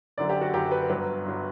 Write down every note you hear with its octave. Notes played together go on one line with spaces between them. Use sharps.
F#1 F#2 D3 F#3 D5
G4
F#4
F#1 F#2 D3 F#3 G4
B4
G1 G2 F#3 B4
G1 F#3